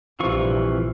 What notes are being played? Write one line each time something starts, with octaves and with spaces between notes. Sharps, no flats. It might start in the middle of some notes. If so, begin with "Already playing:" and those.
A#1 G2 C3 E3 C4 F4 C#6